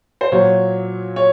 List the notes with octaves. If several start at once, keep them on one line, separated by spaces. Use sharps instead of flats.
C5
A#2 F#3 C#5
C#5